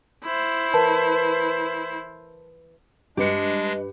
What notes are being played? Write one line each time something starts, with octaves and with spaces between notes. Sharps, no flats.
E4 C5
E3 A#4 B4 C#5 A5
G2 G#3 D4 G4 B4 D#5 C#7